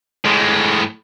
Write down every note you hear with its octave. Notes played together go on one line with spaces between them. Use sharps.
A2 G#3